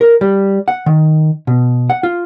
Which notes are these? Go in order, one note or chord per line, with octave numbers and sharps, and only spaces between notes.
A#4
G3
F#5
D#3
B2
F#5
F4